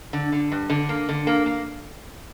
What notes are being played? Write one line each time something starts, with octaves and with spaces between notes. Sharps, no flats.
D3
D3
G2
D3
A#3
D3
A#3
A#3